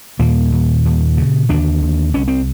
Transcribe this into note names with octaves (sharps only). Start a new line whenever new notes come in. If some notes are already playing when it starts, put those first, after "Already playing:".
D#2 A#2 A#3
D#2
D#2
C#3
D#2 D3 D4
D#2
C2 C#4
C4